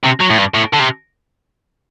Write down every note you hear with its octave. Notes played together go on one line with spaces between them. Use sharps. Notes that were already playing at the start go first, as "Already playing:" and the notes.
C3
F#3
A2
G2
A2
D3
C3